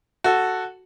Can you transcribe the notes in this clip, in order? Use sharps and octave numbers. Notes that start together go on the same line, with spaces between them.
F#4 A4